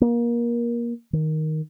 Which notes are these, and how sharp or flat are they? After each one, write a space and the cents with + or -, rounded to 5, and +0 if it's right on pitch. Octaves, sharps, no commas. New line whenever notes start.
A#3 +25
D#3 +5